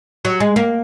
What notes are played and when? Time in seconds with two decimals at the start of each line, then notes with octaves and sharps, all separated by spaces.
0.25 F#3
0.40 G#3
0.56 A#3